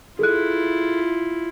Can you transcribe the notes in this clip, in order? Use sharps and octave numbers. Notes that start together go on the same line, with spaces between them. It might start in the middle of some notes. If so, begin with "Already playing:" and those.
E4 F4 G#4 A4 F#6